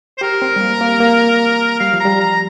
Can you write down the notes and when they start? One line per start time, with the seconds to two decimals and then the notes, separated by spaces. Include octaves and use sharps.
0.18 C5
0.21 G4 A#4
0.42 C4
0.56 G3
0.61 A#3
0.81 A#3
1.00 A#3
1.80 G3 F5
1.93 F3
2.00 A#5
2.05 G3
2.20 A#5